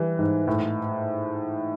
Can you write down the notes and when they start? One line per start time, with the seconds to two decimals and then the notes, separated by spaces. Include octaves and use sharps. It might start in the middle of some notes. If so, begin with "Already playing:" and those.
Already playing: E3 G3
0.19 G#2
0.48 A2